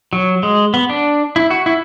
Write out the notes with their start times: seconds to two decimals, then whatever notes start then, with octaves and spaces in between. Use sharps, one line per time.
0.13 F#3
0.43 G#3
0.74 B3
0.90 D4
1.36 E4
1.50 F#4
1.66 E4